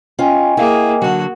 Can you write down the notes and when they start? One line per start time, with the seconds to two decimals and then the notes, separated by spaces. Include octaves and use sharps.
0.19 C#4 F4 D#5 G5 G#5
0.57 A#3 E4 G#4 F5
1.02 D3 F#3 F#4